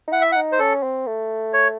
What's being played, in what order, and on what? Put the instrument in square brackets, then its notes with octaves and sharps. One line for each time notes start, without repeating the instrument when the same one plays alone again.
[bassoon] D#4
[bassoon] E4 [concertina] F#5
[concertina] E5
F#5
[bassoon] D#4
[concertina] C5
[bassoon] C#4 [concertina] A4
[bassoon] C4
A3
[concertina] C#5